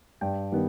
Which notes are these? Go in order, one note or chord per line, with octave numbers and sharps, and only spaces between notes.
G2 G5
D#3 G3 B3